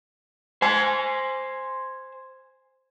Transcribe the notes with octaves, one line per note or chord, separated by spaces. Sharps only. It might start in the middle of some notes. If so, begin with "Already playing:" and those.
C5 G#5